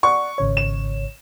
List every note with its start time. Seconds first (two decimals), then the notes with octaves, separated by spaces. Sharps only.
0.03 D5 F#5 C#6
0.38 G#1 C#3 C#5
0.57 E7